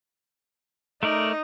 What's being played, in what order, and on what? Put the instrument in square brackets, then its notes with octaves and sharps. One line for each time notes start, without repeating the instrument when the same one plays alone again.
[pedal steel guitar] A3 A#4 D5 [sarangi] D#4